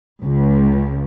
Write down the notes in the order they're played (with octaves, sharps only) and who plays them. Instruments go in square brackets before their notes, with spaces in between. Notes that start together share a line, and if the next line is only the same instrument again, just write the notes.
[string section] C#2